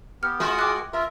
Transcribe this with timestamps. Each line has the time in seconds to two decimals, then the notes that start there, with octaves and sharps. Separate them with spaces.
0.23 B3 G4 F6
0.40 G#3 F4 F#4 A#4 G#5 D#6
0.59 G5 D6 F#6
0.93 F4 A#4 E5